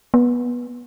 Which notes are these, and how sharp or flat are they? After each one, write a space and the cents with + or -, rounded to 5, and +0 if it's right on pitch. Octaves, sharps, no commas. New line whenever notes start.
B3 -20